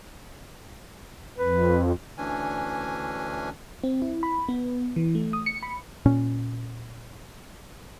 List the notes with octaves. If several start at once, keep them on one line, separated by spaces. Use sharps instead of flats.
F2 B4
D2 E3 C#4 D4 G#5
C4
E4
B5
B3
E3
A3
D#6
C#7
B5
A#2 C#4